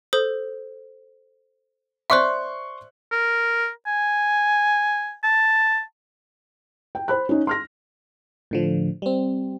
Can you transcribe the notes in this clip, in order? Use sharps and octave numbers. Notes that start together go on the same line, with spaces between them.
A4 C5 D#6
C5 D5 E5 C6 C#6 F#6
A#4
G#5
A5
G5
C5 B5 F#6
C#4 D#4
C6 F6 A#6
A2 D3 F3
G3 C4